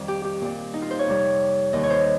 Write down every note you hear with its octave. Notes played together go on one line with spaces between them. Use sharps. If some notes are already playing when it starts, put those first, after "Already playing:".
Already playing: F2 D#3 G3
G4
G4
A#2 G3
D#4
F4
C5
C#5
F2 C3 G3
D#2 D#3 G3 D#5
C#5
C5